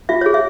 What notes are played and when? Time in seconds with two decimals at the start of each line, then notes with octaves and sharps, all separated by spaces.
0.09 F4 E5
0.21 G#4 C#5
0.34 E5